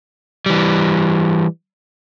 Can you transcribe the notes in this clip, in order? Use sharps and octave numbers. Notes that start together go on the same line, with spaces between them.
E3 G3